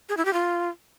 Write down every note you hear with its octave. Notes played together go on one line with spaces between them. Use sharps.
G#4
E4
G4
F4